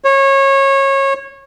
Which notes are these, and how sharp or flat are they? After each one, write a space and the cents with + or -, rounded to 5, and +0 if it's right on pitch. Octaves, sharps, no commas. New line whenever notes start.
C#5 -25